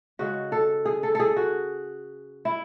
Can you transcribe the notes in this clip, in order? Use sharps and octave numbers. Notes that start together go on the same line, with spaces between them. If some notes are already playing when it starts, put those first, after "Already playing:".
C#3 G#3 F#4
A4
G#4
A4
G#4 A4
F#4
E4